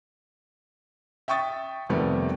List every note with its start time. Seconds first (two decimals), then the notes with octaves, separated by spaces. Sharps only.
1.28 E5 G5 C#6 D#6 A6
1.89 F2 C3 D#3 G3 A3 B3